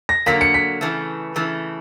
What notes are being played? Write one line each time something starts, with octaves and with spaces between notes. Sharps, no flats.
A#6
D3 F#3 A#3 B6
C#7
B6
C#3 E3 A3
C#3 E3 A3